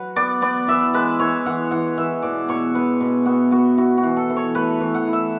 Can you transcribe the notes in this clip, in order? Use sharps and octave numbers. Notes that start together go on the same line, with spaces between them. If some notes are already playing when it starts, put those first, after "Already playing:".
Already playing: F#3 B4 F#5
B3 D5
B3 D5
E3 E5
G#3 B4
E3 C#5
E3 F#5
E3 F#5
E3 E5
B2 D5
B2 C#5
B3 B4
B2
B3 F#4
B3 F#4
E4 F#4
F#4
E3
A4
E3
C#5
A3 B4
E3
F#5
E4
E5